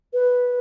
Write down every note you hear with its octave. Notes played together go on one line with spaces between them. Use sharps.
B4